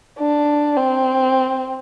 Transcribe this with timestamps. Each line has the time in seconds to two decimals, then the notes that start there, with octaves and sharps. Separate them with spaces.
0.19 D4
0.77 C4